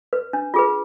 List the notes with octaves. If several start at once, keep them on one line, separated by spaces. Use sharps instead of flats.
B4
D4
F4 G#4 B4